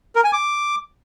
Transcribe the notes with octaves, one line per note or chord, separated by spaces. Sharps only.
A#4
G#5
D6